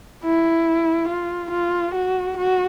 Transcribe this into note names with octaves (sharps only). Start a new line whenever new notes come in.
E4
F4
F4
F#4
F#4